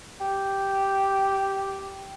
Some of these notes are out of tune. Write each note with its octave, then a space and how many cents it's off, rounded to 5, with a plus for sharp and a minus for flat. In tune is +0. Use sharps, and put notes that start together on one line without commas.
G4 -5